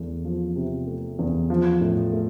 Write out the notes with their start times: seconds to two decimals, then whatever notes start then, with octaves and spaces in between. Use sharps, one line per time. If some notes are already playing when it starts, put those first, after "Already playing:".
Already playing: E2 A3
0.25 F3
0.56 C3
0.87 A3
1.19 E2
1.50 F3
1.81 A2
2.13 A3